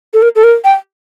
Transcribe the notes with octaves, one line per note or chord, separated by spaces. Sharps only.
A4
A#4
A4
A#4
G5